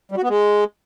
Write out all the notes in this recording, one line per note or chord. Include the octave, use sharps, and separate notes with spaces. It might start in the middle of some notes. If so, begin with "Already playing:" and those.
G3
F#4
B3
G#3